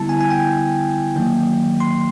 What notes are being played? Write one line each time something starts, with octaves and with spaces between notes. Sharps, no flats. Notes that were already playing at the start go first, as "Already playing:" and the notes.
Already playing: D3 G3 B3 E4 A5
G#5
G#5
G5
D#3 F#3 A#3
C6